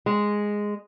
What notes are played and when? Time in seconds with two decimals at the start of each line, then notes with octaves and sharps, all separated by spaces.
0.06 G#3